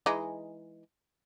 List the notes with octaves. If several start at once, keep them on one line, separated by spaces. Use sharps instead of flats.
E3 G#3 D#4